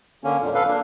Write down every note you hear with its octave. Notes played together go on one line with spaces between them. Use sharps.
D3 A#3 C#4
F2 A#2
A4 B4 F5
A#3 D4